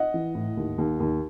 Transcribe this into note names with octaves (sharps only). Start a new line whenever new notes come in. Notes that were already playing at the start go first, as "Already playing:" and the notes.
Already playing: D#5 F#5
E3
A2
D#2
D#2
D#2